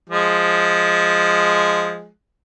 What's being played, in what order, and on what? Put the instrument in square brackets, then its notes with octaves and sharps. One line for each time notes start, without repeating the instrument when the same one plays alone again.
[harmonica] F3 G#3